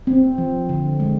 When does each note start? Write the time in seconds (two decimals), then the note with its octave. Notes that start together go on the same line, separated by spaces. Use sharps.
0.07 C4
0.38 F3
0.69 D3
1.00 G#3